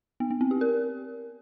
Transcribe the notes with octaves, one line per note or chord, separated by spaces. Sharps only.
B3
B3
C4
G4
A#4